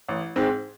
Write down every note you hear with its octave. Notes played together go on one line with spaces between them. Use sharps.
A1
G#2 G#3 C4